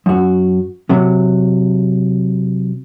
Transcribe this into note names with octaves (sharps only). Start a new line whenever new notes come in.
F#2 F#4
C3 F#3